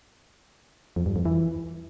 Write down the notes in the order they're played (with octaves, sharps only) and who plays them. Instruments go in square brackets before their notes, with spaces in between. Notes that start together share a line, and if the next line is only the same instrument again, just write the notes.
[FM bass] F2
G2
F2
E3